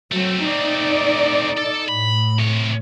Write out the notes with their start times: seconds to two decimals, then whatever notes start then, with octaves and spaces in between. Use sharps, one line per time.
0.12 F#3 A3 C4
0.44 D#4 D5
1.58 A4
1.89 A2 B5
2.39 C3 C#5